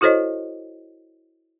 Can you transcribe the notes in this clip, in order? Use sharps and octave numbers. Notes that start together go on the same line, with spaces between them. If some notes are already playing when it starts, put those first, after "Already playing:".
E4 F#4 A4 C5 C#5 D#5